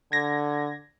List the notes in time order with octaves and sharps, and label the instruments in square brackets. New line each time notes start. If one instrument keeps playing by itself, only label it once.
[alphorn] D3 [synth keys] G#6 A#6